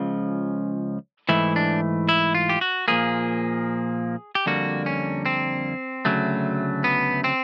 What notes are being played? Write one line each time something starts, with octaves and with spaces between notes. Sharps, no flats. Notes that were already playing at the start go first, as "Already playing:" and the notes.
Already playing: C#2 C#3 F3
G#2 E3 A3 E4
D4
E4
F4
G4
F#4
A#2 F3 A#3 G#4
G4
F2 D3 G3 A#3 F#4
C#4
C4
D2 C#3 F#3 A3
B3
C4